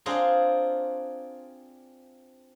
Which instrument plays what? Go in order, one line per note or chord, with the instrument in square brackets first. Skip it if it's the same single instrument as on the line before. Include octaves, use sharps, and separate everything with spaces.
[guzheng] C4 D4 F4 G#4 A#5 C6